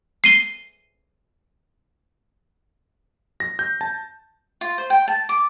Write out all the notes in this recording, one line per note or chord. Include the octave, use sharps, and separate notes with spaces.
C7 D#7 G7
A#6
G6
A5
F4
C5
G5
A5
D6